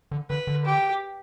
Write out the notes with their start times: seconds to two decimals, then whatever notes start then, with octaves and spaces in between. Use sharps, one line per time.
0.12 D3
0.30 D3 B4
0.47 D3
0.65 G4